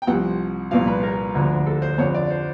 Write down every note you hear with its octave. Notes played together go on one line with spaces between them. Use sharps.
G5
C2 C3 F3 F#5
C2 A#2 F3 F5
B4
A#4
D2 D3 F3
A4
C5
F2 D3 F3 C#5
D5
C5